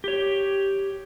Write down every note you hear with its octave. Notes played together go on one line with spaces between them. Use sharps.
G4 C#5